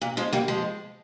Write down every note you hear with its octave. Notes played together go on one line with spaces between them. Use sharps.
A#2
F3 G#3
G3 A#3
F3 G#3